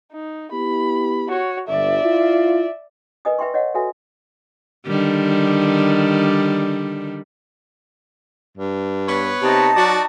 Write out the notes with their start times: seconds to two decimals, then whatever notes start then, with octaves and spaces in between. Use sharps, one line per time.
0.11 D#4
0.52 B3 E4 G4 B5
1.28 F#4 C#5
1.67 G1 D5 E5
2.03 E4 F4
3.25 A#4 B4 D#5 G#5 D#6
3.39 B4 E5 G5 C6 C#6
3.54 C#5 D#5 F#5
3.75 F#4 A4 B4 E5 G#5
4.86 D3 D#3 G3
8.57 G2
9.08 B3 B4 C#5
9.42 C3 D#4 A5
9.77 F#3 F#4 D5